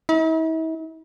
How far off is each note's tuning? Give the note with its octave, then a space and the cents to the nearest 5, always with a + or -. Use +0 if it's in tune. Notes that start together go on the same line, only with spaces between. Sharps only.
E4 -45